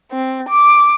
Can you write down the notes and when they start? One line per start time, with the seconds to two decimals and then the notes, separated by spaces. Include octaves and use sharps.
0.12 C4
0.49 D6